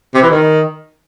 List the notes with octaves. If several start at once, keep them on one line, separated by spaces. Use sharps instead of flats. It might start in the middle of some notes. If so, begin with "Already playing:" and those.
C3
E3
D#3